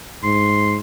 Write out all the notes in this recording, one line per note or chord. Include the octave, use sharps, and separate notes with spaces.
G#2 C6